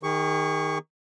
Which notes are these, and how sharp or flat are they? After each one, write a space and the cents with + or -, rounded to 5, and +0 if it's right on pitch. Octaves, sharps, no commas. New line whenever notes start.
D#3 +0 G#4 -40 C#6 +10